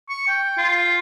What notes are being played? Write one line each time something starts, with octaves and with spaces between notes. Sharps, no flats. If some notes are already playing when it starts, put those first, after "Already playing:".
C#6
G5
F4